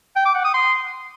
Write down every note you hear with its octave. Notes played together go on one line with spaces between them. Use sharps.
G5
D6
F#5
D#6
C6